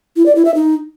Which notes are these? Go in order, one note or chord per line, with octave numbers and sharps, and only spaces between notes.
E4
D5
E4
E5
D#4